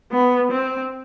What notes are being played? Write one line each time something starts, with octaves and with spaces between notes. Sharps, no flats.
B3
C4